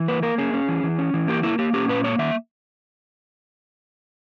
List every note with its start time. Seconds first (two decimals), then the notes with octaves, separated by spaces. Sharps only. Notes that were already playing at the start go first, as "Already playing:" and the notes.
Already playing: E3
0.08 A#3 B4
0.23 A#3 A#4
0.38 C#4 G#4
0.54 C#4
0.68 E3
0.83 E3
0.99 C#4
1.14 E3
1.28 A#3 G4
1.43 A#3 E4
1.59 A#3 G4
1.73 C#4 G4
1.88 A#2 B4
2.04 A#3 C#5
2.18 D#3 E5